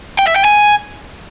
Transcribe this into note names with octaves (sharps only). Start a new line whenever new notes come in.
G5
E5
G5
G#5